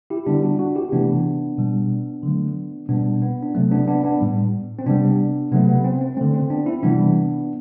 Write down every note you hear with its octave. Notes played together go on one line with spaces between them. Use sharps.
E4 G4
D3 G3 B3 D4
D4 F#4
D4 F#4
E4 G4
C3 E3 A3 B3 D4
B2 G3
D3 F#3 A3
B2 G3 B3 D4
B3
D4
C3 F#3 A3 C4
B3 D4
B3 D4
B3 D4
A2 G3
C4
C3 G3 B3 D4
C3 F#3 A3 B3
B3
C4
C4
D3 A3 C4
C4
B3 D4
C4 E4
C3 E3 G3 B3 D4